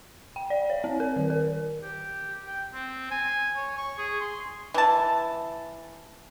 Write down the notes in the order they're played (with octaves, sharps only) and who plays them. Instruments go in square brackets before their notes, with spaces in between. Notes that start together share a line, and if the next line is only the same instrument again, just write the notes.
[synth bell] G5
D5
C#5
C4
A#4
D#3
A#4
[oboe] G4
G5
C4
G#5
C#5
C#6
G#4
C6
[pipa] E3 A5